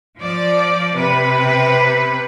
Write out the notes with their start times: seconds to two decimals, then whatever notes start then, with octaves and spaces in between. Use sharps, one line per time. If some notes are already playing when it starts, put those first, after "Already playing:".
0.17 F3 D5
0.95 C3 B4